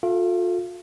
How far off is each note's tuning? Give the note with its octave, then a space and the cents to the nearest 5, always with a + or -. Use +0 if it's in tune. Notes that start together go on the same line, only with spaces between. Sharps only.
F4 +40 A4 +0 F5 -40